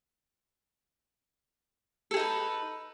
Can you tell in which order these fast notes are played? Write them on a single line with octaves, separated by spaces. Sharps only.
A4 G#4 D#4 B4